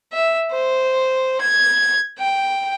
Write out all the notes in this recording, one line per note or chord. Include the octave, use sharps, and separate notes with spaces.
E5
C5
G#6
G5